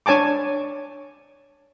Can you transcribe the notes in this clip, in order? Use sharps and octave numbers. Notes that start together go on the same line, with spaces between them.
D4 C#5 G#5 A5 D6